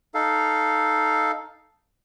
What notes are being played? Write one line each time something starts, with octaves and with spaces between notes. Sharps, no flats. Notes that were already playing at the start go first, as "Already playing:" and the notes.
D#4 A4 F5